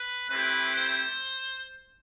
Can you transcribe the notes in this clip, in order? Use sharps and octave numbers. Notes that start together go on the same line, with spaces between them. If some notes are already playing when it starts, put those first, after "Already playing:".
Already playing: B4
A3 C4 E4 G4 B4
C5